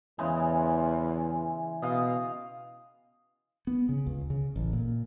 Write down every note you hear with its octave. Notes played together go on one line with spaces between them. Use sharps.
E2 C#3 E3 G#3
B2 D#5 F5
B3
C#3
C#2
C#3
A1
A#2